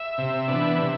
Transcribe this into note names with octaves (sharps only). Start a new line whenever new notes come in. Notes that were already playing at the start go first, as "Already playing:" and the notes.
Already playing: E5
C3
E3 B3 D4
C3